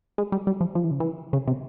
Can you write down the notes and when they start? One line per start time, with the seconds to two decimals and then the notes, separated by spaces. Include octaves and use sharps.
0.18 G#3
0.32 G3
0.47 G3
0.61 F3
0.75 F3
0.84 E3
0.91 C#3
1.00 E3
1.33 C#3
1.47 C3